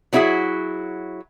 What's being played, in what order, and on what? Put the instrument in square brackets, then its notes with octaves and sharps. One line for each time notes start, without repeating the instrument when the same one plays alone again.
[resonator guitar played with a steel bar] F#3 C4 E4 F#4 G#4 E5